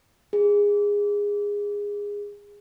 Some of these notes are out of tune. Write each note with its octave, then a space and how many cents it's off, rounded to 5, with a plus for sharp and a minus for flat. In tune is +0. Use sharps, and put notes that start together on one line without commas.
G#4 -20